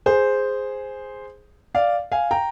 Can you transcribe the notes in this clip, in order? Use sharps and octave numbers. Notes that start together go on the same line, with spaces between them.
G#4 C5
D5 F5
F5 G#5
G5 A#5